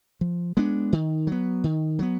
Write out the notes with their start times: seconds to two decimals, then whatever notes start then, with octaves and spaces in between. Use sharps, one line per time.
0.21 F3
0.57 G#3 B3 D4
0.93 D#3
1.27 F#3 B3
1.64 D#3
1.99 F#3 B3